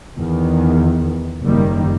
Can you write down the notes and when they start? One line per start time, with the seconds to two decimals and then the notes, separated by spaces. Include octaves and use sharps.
0.17 E2 D#3
1.43 F#1 D#3 G3 A#3